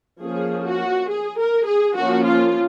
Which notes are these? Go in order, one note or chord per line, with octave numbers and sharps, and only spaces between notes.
F3 A#3 C#4 G#4
F#4
G#4
A#4
G#4
F3 A#3 C#4 F#4
F4